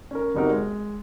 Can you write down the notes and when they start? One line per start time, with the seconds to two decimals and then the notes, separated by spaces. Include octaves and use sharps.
0.11 C#4 A#4
0.34 G1 C3 D#4 F#4 A#4
0.50 G#3